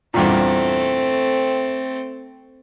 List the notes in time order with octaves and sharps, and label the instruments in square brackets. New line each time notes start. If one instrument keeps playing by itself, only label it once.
[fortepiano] E2 G2 A#2 [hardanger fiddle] A3 C4